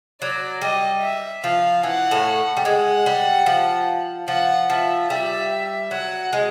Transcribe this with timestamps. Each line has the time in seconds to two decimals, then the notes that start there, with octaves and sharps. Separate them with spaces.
0.21 F#3 D5
0.61 G3 D#5
1.02 E5
1.43 F3 F5
1.83 E3 F#5
2.11 A2 A3
2.57 G3
2.65 G#3 F#5
3.06 G3
3.46 F3
4.28 F3 F#5
4.69 F3 E5
5.10 G3 E5
5.50 E5
5.91 F#3 F#5
6.33 G#3